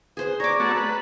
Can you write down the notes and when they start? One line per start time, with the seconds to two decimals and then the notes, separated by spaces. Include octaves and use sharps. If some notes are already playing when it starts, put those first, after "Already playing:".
0.17 G#4 B4 C5
0.40 C#5 D5 A#5 D6
0.60 A3 B3 F#4 A5 A#5
0.76 B4